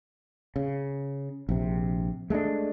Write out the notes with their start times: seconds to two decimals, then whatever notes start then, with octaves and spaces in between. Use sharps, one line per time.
0.56 C#3
1.49 A#1 C3
2.30 G#3 A3 C#4 D4